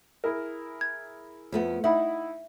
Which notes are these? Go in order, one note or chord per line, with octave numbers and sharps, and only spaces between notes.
E4 G#4 A#4
G#6
F2 A3 B3
D#4 E4 E5 F#5 B5